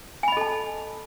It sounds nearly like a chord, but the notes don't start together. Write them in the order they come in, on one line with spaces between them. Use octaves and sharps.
G#5 B5 D#5 A4 A5